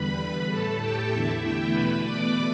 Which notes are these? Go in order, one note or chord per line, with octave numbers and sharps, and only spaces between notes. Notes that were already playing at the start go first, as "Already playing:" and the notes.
Already playing: E2 D3 G3 B4 B5
A2 A3 A4 A5
G4 G5
E2 D3 A3 E4 E5
G4 G5
E2 B2 A3 B4 B5
D5 D6